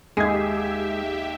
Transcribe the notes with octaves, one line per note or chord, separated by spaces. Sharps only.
D#2 G#3 D#4 G4 G#4 E5 G#6